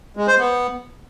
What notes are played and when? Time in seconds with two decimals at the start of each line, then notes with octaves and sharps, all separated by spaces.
0.17 G#3
0.28 C5
0.39 B3